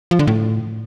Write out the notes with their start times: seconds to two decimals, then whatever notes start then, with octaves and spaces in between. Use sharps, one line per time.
0.11 F3
0.19 D3
0.27 A2